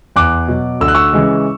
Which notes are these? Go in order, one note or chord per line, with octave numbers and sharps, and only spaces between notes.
E2 D6 F#6
B2 F#3
D2 E6
F#6
C#6 E6
C#3 E3 G#3